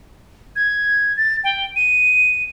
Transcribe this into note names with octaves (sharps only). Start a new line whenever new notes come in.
G#6
A6
G5
D#7